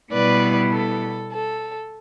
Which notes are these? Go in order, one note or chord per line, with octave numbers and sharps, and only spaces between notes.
B2 G3 B3 E4 B4 D5
A4
A4